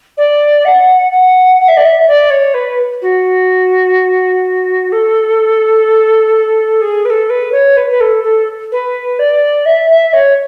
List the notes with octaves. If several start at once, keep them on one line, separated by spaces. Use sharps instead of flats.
D5
F#5
F#5
F#5
E5
D5
E5
D5
C#5
B4
F#4
A4
G#4
B4
A4
B4
C#5
B4
B4
A4
A4
B4
D5
E5
E5
C#5